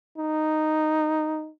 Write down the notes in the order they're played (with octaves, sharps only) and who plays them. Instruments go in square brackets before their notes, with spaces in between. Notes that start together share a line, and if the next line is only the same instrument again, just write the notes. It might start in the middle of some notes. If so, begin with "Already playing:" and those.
[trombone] D#4